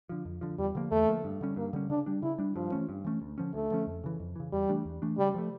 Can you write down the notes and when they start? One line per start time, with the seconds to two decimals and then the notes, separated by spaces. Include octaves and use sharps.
0.09 D3 F3
0.25 F2
0.41 D3 F3
0.58 E2 G3
0.75 D3 F3 A#3
0.91 E2 A3
1.07 D3 F3 A#3
1.24 G2
1.41 D3 G3 C#4
1.56 G2 A#3
1.73 D3 G3 C#4
1.90 C#3 D4
2.06 G3 D4
2.23 C#3 E4
2.38 G3 D4
2.56 G2 F3
2.72 E3 A3 C#4
2.89 G2
3.04 E3 A3 C#4
3.22 D2
3.38 D3 F3 C#4
3.54 D2 A3
3.71 D3 F3 C#4
3.87 F2
4.04 C#3 E3
4.20 F2
4.36 C#3 E3
4.52 E2 G3
4.69 E3 A3 D4
4.85 E2
5.02 E3 A3 D4
5.18 C#3 G3
5.34 F3 A3